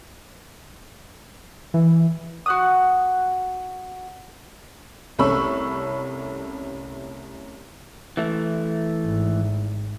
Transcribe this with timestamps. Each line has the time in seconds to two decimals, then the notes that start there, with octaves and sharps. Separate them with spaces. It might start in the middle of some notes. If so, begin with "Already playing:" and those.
1.74 E3
2.46 F#4 F#5 D#6
5.19 C2 A3 C#4 B5 C#6 E6
8.17 E3 A3
9.04 G#1